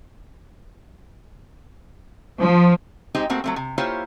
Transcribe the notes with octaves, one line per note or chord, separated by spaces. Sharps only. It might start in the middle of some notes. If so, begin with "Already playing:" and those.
F3
G#3 C4 D#4 G4 C5
A3 A#3 C4 F#4
F#3 A3 C4
C3
A#3 E4 F4 G4 C5 C#5